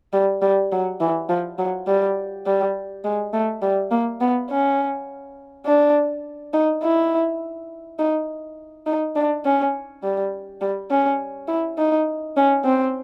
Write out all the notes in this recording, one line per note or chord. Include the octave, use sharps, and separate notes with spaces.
G3
G3
F#3
E3
F3
F#3
G3
G3
G#3
A3
G3
A#3
B3
C#4
D4
D#4
E4
D#4
D#4
D4
C#4
G3
G3
C#4
E4
D#4
C#4
C4